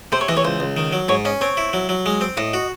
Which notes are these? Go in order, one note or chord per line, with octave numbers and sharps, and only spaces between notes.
C3 C5
C#5
E3 D#5
C#5
C#2 C5
C#2
D#3
F#3
G#2 C#5
C#4 D#5
C4 C#5
E4
F#3
F#3
G#3
C4
A2 D#5
F#4